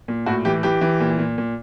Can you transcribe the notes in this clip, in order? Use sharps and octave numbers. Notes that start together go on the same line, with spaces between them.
A#2
A2 F#4
E3 G4
E3 G4
E3
A#2
A#2
A#2